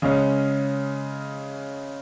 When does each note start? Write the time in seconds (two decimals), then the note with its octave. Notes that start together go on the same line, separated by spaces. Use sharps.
0.02 C#3 G#3 C#4